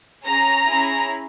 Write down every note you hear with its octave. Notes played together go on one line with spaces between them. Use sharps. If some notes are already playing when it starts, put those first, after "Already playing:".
C#4 G#4 A#5
C#4 E4 G#4